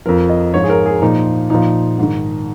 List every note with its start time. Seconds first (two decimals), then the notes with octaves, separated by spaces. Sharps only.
0.06 F2 F3 A#4
0.29 D#5
0.54 G#2 F3 C#5
0.64 G#4
0.70 A#4
0.86 G#4
1.02 A#2 F3 D#4
1.50 A#2 F3 D#4
1.98 G#2 D#3